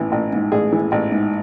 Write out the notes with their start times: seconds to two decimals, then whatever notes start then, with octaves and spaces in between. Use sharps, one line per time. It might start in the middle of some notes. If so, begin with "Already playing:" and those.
Already playing: A1 E3
0.12 A1
0.33 G#2
0.52 A1 G#4
0.72 E3
0.92 A1
1.12 G#2